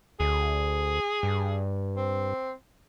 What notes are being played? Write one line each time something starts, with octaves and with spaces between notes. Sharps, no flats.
D2 G#4
G2
C4